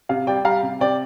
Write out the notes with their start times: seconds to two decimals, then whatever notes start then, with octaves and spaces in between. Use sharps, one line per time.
0.09 C3 F5
0.27 G3 D5 G5
0.45 G3 F5 A#5
0.63 C3
0.81 C3 D5 G5